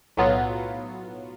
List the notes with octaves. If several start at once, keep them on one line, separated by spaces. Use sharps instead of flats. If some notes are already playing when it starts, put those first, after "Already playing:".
B1 A2 F#3 B3 F4